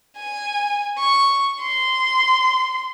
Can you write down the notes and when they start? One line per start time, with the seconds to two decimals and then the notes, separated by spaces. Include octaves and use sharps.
0.17 G#5
0.99 C#6
1.62 C6